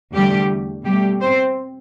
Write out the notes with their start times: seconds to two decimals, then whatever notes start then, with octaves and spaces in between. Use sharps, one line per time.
0.14 E2 D3 G3 A3 G4
0.85 B2 G3 A3 G4
1.22 C4 C5